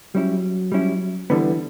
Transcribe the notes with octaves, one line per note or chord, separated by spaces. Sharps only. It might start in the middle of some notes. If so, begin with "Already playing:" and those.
F#3 G3 C#4 E4
G3 C#4 E4
D3 E3 G3 B3